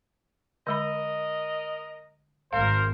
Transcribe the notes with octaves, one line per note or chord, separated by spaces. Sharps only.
D3 G#3 A#4 D#5 B5
G#1 A#4 C5 F5